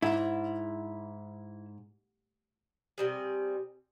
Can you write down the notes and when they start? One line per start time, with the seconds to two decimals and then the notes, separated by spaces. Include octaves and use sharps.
0.02 G#2 E4
2.98 C3 G3 G#4